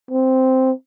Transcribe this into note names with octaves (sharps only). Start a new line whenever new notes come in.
C4